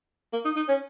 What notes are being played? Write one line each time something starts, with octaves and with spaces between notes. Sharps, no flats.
A#3
D#4
D#4
C#4